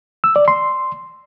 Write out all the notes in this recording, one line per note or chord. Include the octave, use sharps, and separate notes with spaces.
E6
D5
C6